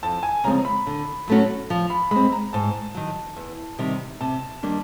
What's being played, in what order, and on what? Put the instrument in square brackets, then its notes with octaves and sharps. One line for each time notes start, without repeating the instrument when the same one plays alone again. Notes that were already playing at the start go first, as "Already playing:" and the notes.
[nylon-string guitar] F2 [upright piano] A5
[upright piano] G#5
[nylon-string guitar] C#3 F3 G#3 C4 [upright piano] A#5
[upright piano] A#5
B5
[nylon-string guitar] D3
F#3 A3 C#4 F#4
F3
[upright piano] B5
[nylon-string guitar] G#3 C4 [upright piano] B5
[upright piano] A#5
[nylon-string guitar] G#2 [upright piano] A5
[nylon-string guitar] D#3 F#3
E2
C3 D#3 G3
[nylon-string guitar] C3 [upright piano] A5
[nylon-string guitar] D#3 G3 A#3 D4